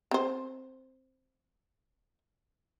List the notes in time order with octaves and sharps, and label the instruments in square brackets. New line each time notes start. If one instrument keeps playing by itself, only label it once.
[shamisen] C4 C5